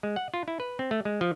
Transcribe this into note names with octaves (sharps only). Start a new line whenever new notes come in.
G#3
F#5
F4
E4
B4
C4
A3
G#3
F3